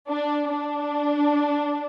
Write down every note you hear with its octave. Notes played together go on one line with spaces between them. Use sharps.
D4
D4